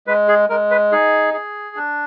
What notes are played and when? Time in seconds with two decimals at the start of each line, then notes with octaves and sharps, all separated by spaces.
0.07 G#3 B4
0.28 G#4
0.49 G#3 A#4
0.71 B4
0.92 D#4 G#4
1.34 G#4
1.76 D4